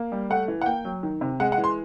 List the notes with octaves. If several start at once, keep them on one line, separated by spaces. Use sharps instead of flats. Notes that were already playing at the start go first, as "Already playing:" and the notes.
Already playing: A#3
G3
A3 F#5
E3
F#5
A#3 G5
F#3
D#3
C3
G#3 F#5
F#5
E3
C6